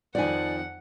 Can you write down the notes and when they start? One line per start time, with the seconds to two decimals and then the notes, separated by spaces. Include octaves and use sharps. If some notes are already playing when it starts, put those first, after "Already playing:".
0.15 F2 D#3 F3 D5 F#5 G#5